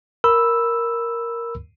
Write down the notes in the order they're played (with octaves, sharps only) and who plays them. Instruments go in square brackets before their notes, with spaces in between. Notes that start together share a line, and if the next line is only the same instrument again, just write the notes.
[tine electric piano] A#4 B5 E6